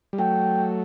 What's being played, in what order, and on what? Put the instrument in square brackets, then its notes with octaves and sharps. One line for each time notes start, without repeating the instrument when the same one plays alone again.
[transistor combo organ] G3
[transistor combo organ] F#3 A3 [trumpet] G5